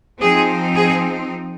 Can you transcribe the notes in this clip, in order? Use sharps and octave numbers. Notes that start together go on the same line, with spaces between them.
F3 C4 D#4 G#4
G#4